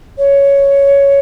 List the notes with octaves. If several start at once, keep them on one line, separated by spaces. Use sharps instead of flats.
C#5